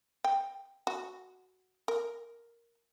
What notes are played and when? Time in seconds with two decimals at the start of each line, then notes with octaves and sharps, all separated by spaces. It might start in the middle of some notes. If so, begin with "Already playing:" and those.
0.24 G5
0.87 F#4
1.88 A#4